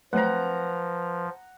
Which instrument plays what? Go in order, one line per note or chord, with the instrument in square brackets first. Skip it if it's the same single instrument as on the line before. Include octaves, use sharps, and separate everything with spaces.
[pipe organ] F3 [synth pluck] F#3 A3 C4 [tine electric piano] B4 C5 [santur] F#5 A#5